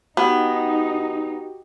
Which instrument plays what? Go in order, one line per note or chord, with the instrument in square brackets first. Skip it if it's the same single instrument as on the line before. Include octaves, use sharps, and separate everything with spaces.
[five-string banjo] B3 [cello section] D#4 [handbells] F#4 G4 G5